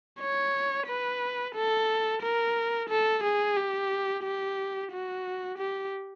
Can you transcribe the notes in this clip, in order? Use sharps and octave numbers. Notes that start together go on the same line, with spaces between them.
C#5
B4
A4
A#4
A4
G#4
G4
G4
F#4
G4